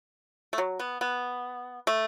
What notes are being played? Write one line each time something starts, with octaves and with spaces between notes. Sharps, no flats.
A3
F#3
B3
B3
A3